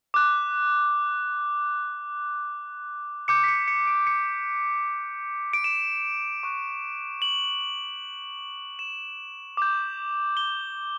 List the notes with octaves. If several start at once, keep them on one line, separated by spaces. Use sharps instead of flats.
D6 F#6
D6 G6 C#7
B6
C#7
C#7
D7
C#7
D7
E7
C#6 F#6
F#7
E7
D6 G6
G7